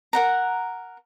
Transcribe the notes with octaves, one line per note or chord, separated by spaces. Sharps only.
A#4 F#5 A#5